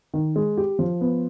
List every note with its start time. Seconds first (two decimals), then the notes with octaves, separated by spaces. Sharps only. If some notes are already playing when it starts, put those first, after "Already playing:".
0.14 D#3
0.36 G#3
0.57 G4
0.79 F3
1.01 B3